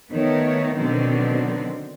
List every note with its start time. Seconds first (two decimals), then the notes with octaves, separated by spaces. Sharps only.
0.12 D#3 A3 B3 C#5
0.76 B2 D3 D#3 F#3 B3 C4